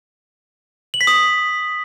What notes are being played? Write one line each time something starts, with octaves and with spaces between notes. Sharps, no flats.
F#7
B6
D#6